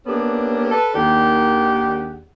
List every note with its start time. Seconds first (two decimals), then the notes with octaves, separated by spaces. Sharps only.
0.06 A#3 B3 C#4 D4 G4 A4
0.71 A4 B4
0.94 D#2 D#3 D4 G4 G#4 F#5